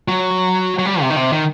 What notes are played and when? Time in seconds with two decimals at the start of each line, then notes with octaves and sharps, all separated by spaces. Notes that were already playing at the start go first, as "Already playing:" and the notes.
0.08 F#3
0.79 F#3
0.86 G3
1.01 C3
1.10 D#3
1.16 C3
1.32 D#3